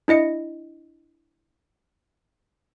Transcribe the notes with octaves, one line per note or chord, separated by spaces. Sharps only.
D4 E4 D#5 C#7